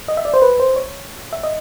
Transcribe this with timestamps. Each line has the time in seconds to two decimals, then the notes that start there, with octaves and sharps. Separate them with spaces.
0.08 D#5
0.17 E5
0.25 D5
0.34 C5
0.42 B4
0.60 C5
0.76 C#5
1.33 E5
1.43 D#5